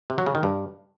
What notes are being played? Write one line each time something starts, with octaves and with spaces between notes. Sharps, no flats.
C3
F#3
C#3
D#3
G2